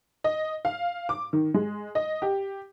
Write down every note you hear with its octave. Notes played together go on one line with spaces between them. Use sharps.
D#5
F5
D6
D#3
G#3
D#5
G4